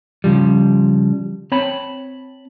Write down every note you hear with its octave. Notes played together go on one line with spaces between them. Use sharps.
C#3 F3 G3
C4 C#5 A5 B5